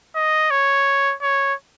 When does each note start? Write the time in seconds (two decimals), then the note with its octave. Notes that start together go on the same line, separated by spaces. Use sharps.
0.16 D#5
0.51 C#5
1.22 C#5